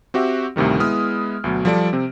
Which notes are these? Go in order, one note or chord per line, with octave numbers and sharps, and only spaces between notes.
C4 F#4 G4 E5
D2 A2 C3 D#3 G3
G#3 B3 E4 D#6 F6
D2 B2 F#3
F3 G3 A4 D5 A5 D7
C3 C4